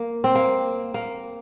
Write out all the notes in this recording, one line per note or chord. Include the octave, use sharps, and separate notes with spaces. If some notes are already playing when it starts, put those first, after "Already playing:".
Already playing: A#3
C4
A#3
A#3